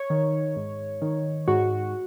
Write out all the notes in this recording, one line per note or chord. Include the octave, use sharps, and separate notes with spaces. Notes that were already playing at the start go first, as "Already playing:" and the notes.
Already playing: C#5
D#3
G#2
D#3
G#2 F#4